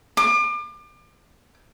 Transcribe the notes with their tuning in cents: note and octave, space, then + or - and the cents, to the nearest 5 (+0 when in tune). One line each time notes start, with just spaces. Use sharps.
D6 +35